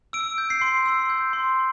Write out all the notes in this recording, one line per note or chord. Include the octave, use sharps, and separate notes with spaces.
E6 D7
G6
C7
C6
E6
G6
C6